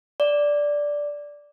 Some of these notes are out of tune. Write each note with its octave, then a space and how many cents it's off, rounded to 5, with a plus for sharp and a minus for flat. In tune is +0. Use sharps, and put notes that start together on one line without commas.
D5 -5